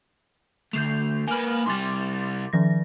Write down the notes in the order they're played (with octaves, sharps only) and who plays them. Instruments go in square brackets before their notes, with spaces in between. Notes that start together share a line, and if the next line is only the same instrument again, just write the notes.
[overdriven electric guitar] D2 A3 [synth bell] G6 C7 F7
[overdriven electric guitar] A#3 B4 [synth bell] G#5 F6
[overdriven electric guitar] C2 G3 [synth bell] C6 D6 A6
[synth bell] D#3 F3 A#6